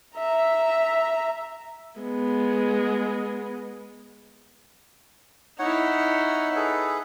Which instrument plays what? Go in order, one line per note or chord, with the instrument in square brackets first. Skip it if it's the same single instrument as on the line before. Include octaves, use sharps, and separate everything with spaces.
[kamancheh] E5 A#5
[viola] G#3 B3
[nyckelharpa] D#4 E4 [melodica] C#5 F#5
[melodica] G#4 A4 B4